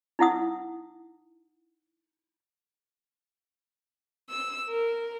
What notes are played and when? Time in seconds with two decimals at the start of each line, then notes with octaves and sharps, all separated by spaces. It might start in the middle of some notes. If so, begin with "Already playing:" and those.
0.19 D#4 E4 F#5 D#6
4.30 E6
4.70 A#4